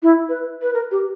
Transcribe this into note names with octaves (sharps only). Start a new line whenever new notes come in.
E4
B4
B4
A#4
G4